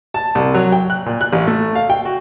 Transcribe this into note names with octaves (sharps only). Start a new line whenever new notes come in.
A5
C2
F#3
G5
F#6
A#2
F#6
A1
A3
F5
G5
F#4